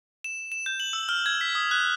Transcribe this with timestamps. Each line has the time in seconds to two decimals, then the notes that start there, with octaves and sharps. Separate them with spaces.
0.24 E7
0.52 E7
0.66 G6
0.80 F#7
0.93 E6
1.09 F6
1.26 G#6
1.41 B6
1.55 D#6
1.71 F#6